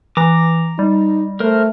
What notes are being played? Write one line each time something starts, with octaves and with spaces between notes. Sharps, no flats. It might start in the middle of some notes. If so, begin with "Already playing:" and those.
E3 A#5 D6
G3 D#4
A3 A#4 C5